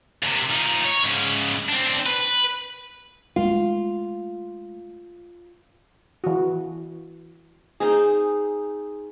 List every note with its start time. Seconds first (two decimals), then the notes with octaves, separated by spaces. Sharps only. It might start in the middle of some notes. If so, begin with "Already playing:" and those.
0.23 D#2 C3
0.50 F3 D#4
0.84 C#5
1.03 G#2 C#3
1.69 C4 D4
2.06 B4
3.36 G#3 A3 F4
6.24 E3 F#4
7.80 C4 D#4 G#4